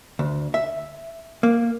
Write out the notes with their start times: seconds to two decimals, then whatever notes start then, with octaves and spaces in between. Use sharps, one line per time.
0.19 D2
0.54 E5
1.43 A#3